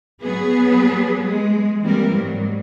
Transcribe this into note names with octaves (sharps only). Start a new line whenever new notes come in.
F#3 B3 G#4 B4
G#3
E3 G3 A#3 C4 A#4
G#2 F#3 G3